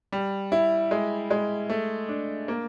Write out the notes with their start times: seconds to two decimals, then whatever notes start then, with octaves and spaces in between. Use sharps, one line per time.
0.12 G3
0.52 E4
0.91 G#3
1.30 G#3
1.70 A3
2.09 D4
2.48 A#3